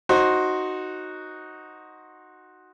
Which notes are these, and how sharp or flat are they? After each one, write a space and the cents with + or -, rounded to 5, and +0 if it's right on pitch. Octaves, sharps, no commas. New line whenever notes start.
D#4 +0 F#4 +0 C5 +15